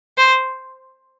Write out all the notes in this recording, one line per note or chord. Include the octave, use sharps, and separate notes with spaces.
C5